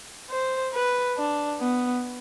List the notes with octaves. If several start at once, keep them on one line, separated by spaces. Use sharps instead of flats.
C5
B4
D4
B3